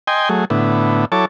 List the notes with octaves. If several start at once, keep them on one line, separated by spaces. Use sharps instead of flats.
D#5 G5 G#5 C6
F#3 A3 G#4
A2 D3 B3 E4
F#3 E4 A4 C#5 A5 D6